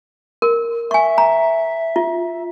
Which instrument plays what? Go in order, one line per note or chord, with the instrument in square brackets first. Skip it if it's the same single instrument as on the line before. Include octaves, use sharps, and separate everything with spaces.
[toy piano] A#4
[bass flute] E5 [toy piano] G#5 C#6
[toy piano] A#5
F4